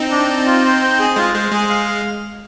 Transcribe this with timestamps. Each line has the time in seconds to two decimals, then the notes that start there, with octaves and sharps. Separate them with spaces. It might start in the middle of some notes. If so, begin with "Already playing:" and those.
Already playing: C4 D#4
0.11 D4
0.29 D5
0.46 F4
0.64 C5
0.82 G5
0.99 G#4
1.16 G#3 F4
1.34 G#3 C5
1.52 G#3 G#4
1.69 F5